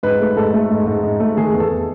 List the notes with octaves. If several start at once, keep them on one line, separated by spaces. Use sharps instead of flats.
G#2 B4
A3
G#2 A4
A3
G#2
G#2
G#2
A3
D#3 G#4
E2
A4